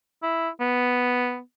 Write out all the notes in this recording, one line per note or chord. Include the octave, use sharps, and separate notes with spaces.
E4
B3